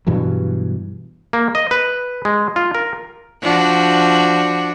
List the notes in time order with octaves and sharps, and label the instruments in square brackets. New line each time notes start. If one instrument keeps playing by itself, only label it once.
[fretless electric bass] G2 B2 E3 F#3
[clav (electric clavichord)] A#3
D#5
B4
G#3
F4
A#4
[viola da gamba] F3 D4 F#4